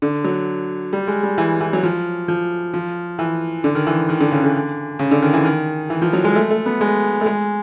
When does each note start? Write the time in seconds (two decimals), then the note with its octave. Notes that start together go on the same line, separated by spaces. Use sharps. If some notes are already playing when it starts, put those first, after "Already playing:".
0.02 D3
0.24 F#3
0.93 G3
1.08 G#3
1.23 G3
1.38 E3
1.60 E3
1.73 F#3
1.83 F3
2.28 F3
2.74 F3
3.19 E3
3.64 D3
3.75 D#3
3.87 E3
4.09 D#3
4.20 D3
4.32 C#3
4.44 D3
4.99 C#3
5.11 D3
5.22 D#3
5.33 E3
5.45 D#3
5.90 E3
6.02 F3
6.13 F#3
6.24 G#3
6.35 A3
6.50 A3
6.66 B3
6.81 G#3
7.21 A3
7.26 G#3